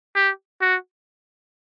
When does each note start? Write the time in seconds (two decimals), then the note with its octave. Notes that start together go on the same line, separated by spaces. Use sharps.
0.15 G4
0.61 F#4